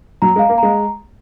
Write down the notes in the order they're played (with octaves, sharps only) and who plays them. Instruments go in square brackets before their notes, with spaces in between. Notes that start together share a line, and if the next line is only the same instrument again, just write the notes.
[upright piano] F#3 [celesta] A#5
[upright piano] G#3
[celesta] F5
[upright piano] A#3
[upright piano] G#3 [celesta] A#5